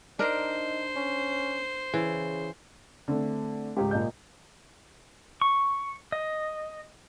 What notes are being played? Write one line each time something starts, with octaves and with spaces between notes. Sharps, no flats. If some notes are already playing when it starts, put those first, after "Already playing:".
D4 D#4 A#4 C5
C#4
C#3 E3
D3 A3 C4
G#1 C#2 G#2 G4
A#2 D#5 G6
C#6
D#5